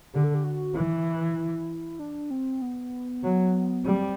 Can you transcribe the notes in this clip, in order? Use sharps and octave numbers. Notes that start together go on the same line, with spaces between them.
D3 G4
A4
G4
F#4
E3 E4
D4
C4
B3
F#3
G3 C4